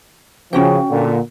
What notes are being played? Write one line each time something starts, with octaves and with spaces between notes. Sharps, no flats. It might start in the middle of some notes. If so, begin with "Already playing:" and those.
C#3 F3 C#4 F#4 G5
A#2 D3